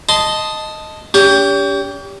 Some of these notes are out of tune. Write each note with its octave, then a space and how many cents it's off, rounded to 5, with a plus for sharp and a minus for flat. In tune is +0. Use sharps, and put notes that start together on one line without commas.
D#5 +0 A5 +0 C6 -15
C#4 +45 G4 +10